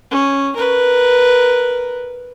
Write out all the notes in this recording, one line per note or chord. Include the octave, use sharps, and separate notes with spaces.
C#4
A#4 B4